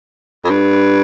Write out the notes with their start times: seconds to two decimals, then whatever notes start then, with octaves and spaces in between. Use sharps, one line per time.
0.45 F2
0.50 G2